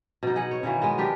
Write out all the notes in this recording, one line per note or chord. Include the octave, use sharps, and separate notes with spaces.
B2 D#4
D#4 G#4 D#5 F#5
C#5
B2 D#3 E3 A#3
G#3 B3
D4 G4 A#4 B4